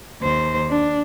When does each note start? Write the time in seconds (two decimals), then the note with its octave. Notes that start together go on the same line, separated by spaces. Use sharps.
0.22 D#2 C5
0.70 D4